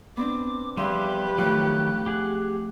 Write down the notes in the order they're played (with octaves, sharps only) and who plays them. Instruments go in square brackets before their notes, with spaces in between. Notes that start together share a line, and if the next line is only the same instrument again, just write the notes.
[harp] B3 C4 D4 [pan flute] D6
[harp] E2 F3 E5 [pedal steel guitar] G3 B3 [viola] G4 B4 [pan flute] C6
[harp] A2 F4 [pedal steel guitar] D#3 F#3 [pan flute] F#6
[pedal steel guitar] G4 G#4 F#5